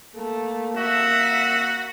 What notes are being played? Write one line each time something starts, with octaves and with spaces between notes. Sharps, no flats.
A3 A#3
F#4 E5